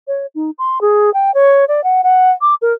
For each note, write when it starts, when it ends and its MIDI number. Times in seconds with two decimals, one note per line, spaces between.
0.08 0.26 73
0.35 0.50 63
0.58 0.81 84
0.81 1.13 68
1.14 1.33 79
1.34 1.65 73
1.68 1.83 74
1.84 2.02 78
2.04 2.31 78
2.41 2.55 86
2.62 2.73 70